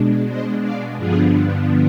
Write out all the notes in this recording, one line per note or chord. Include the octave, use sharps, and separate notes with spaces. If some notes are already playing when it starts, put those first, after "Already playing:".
Already playing: B2 G#3 D4
C5 D#5
D5 F5
G2 D3 F3 B3 D4 F4 G#4